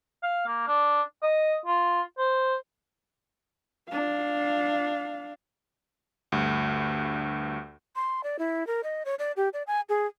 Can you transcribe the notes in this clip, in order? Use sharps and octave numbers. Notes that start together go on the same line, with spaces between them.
F5
A#3
D4
D#5
F4
C5
D4 F5
D2 G2
C6
D5
E4
A#4
D#5
C#5
D5
G4
D5
G#5
G#4